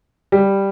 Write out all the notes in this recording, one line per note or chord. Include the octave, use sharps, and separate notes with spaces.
G3